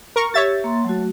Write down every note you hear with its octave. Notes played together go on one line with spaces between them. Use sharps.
A#4 C#6
G4 C#5 E5 A6
A#3 C6
F#3 A3 F#4